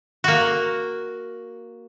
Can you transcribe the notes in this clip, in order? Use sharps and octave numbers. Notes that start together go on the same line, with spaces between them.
A#3 F#4